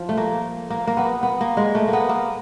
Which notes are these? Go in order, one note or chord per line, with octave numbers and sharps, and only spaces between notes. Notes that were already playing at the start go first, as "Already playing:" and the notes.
Already playing: F3
A3
A#3
A#3
A#3
B3
B3
A#3
G#3
A3
A#3
B3
A#3